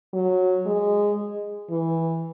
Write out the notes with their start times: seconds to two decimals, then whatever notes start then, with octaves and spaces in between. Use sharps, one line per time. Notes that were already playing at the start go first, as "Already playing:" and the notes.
0.14 F#3
0.66 G#3
1.70 E3